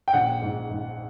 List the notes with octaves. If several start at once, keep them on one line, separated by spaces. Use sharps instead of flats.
G5
A#1 F#5
G#2
G#2